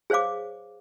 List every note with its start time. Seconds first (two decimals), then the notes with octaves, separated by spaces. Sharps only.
0.10 G#4 C5 C#5 F5 D6